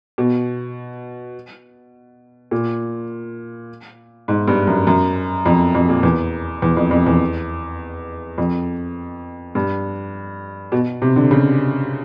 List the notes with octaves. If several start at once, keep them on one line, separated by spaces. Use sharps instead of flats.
B2
A#2
G#2
G2
F#2
F#2
F2
F2
A#2
E2
E2
F2
F2
E2
F2
G2
B2
C3
D3
C#3